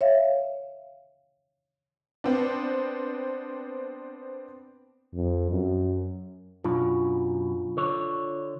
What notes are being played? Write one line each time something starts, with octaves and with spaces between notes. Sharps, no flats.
C#5 E5 F5
B3 C4 D4
F2
F#2
F#2 B2 D4 F4
D3 C#5